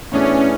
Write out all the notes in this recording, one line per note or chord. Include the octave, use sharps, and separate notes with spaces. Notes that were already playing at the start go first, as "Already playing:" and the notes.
A2 E3 B3 C#4 D4 G#4